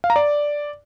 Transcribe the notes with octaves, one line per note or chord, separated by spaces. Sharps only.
F5
A#5
D5